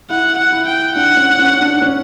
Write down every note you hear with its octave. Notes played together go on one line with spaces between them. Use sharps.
E4 F#5
F#5
E4
G5
D4 F#5
C#4
C#4
D4
C#4